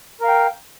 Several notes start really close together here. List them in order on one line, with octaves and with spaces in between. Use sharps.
A#4 F5 G5